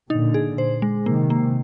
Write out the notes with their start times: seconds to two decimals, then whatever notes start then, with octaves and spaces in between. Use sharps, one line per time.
0.10 A#2 D3 D#4
0.34 G#4
0.58 C5
0.82 G#3
1.06 C3 D#3 A#3
1.30 A#3